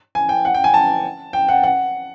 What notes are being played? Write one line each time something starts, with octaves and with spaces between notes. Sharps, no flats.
G#5
G5
F#5
G5
G#5
A5
G5
F#5
F#5